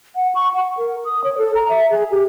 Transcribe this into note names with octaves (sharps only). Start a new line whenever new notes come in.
F#5
C#6
F#5
A#4
D#6
C#5
A4
A#5
E5
G#4
G4